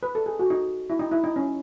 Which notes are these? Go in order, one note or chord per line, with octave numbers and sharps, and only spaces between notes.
B4
A4
G#4
F#4
D#4
E4
D#4
E4
D#4
C#4